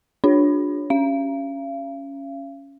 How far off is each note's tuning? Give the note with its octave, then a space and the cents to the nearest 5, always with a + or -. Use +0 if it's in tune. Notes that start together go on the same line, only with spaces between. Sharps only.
D4 +0 F4 +40 C#5 +0
C#4 +0 F5 -40